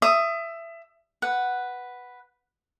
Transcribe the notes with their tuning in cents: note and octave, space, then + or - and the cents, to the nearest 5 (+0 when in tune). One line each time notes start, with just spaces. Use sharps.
E5 +20 D#6 +0
B4 +0 F#5 +0